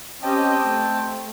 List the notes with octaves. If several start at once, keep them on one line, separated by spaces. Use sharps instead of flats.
C4 C#4 G4 D#5 G5 A5
A3